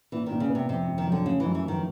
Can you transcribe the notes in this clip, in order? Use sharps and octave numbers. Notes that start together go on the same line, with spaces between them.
A#2 E3
A#2 D#3
C#3
B3
C3
F2 C3
F2
D#3
D3 F#3
C#3 A3
E3
F#2
E3
D#3 F3